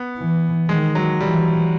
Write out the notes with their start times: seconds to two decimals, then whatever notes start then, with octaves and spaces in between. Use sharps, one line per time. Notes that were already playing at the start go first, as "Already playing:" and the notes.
Already playing: B3
0.18 E3
0.68 D#3 G#3
0.95 F#3
1.21 E3 G3